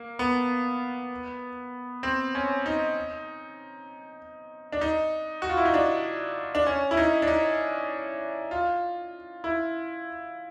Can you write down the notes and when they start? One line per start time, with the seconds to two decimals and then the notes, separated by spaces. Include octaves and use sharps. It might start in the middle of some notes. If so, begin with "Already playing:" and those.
Already playing: A#3
0.19 B3
2.03 C4
2.35 C#4
2.66 D#4
4.72 D4
4.81 D#4
5.42 F#4
5.49 F4
5.57 E4
5.65 D#4
5.74 D4
6.55 D4
6.67 C#4
6.91 E4
6.97 D#4
7.22 D4
7.27 D#4
8.51 F4
9.44 E4